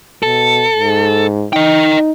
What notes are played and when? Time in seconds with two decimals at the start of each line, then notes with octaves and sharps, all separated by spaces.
0.23 B2 A4
0.75 G#2
1.53 D#4 D#5 G5